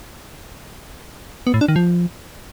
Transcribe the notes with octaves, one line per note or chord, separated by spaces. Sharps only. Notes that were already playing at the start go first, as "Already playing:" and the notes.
B3
A2
D4
D#3
F3